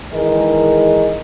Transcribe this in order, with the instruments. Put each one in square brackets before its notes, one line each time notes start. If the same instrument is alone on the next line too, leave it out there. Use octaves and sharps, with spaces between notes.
[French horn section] D#3 E3 G#3 G#4 A#4 D#5